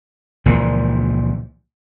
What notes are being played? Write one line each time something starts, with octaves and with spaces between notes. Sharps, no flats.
C#2 A#2 E3 F3